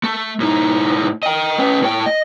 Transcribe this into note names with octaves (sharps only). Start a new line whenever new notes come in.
A3
A2 D#4
D#5 G5
C#4 B4
A2 G5
D#5